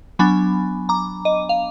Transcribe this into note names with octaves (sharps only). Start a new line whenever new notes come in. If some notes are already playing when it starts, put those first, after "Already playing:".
F#3 B3 D4 G#5 B5
A#5 D6
D#5
F5